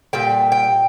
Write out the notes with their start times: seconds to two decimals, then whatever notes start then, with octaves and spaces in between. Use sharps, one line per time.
0.13 A#2 G3 G5
0.52 G5